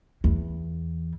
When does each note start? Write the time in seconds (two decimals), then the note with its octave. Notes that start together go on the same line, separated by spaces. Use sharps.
0.24 E2